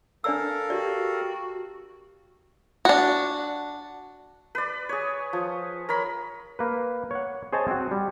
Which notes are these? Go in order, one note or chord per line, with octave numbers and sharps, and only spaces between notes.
D4 A4 A#4 D5 F5 E6
F#4 G4 D5
D4 F#4
B4 D5
G#4 C#5
F3
A#4 C#5 B5
A#3 B4
C#5 F#5
G#4 C5 C#5 D#5 G#5 A5
C4 F#4
G3